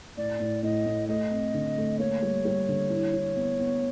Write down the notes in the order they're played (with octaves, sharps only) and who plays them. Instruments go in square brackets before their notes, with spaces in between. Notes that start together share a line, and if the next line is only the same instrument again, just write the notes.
[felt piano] A2 [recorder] D5
[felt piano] A2
[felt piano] A2 [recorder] D#5
[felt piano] A2
[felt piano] A3 [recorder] D#5
[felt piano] C4
D3
A3
[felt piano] A#3 [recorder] C#5
[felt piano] G3
G3
D3
E4
E4
B3
B3